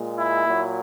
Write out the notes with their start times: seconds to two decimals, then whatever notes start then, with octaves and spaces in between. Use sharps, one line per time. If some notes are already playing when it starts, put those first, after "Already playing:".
Already playing: A#2 G#3
0.16 E4
0.47 A#2 F#3